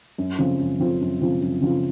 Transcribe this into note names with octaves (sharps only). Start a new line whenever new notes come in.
F#2
C#3 F3 C4 F4
F#2
C#3 F3 C4 F4
F#2
C#3 F3 C4 F4
F#2
C#3 F3 C4 F4